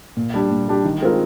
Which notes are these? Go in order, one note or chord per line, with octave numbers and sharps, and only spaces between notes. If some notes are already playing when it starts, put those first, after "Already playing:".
A#2
G3 D4 G4
A#2
G3 D4 G4
D#3
G#3 C4 F4 A#4